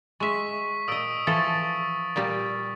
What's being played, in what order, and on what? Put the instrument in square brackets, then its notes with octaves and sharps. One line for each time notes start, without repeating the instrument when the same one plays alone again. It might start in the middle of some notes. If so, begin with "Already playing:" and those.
[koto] G#3 E5 [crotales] C#6 B6
[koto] A#2 D#5 [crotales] D#6 E6 D7
[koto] E3 F3 A4 [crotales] C#6 A6
[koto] A#2 G3 G4